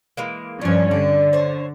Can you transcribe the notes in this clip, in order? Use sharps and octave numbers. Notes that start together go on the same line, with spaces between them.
E3 G#3 A#3
G2 F3 C#4 D4 C#5
D3 D4
C5 C#5